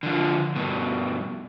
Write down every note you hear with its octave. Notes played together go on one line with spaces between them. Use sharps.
D3 F3
G2 B2